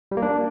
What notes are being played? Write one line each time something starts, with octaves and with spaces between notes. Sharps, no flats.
G3
A#3
D4